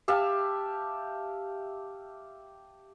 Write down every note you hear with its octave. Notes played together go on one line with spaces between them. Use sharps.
G4 E5 F5 A5